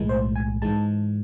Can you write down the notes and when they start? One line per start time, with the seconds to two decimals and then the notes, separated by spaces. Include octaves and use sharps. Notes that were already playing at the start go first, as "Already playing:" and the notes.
Already playing: B1 A2 E3 G#3
0.09 C5
0.35 G#5
0.62 G#2 E3 G#3 A5